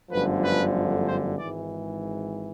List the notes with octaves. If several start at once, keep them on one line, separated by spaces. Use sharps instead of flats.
G1 F#2 D3 F3 A3 B4
B4
C5
G#1 G#2 E3 D5